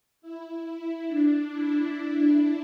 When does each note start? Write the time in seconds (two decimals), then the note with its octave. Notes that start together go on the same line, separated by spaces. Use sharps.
0.22 E4
0.65 E4
1.08 D4
1.51 E4